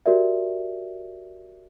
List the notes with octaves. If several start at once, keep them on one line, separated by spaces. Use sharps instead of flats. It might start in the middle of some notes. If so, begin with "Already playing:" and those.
F#4 G4 A#4 D5 E5